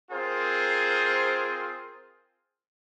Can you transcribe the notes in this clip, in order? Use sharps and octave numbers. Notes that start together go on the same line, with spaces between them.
C4 F4 G#4 A#4 C5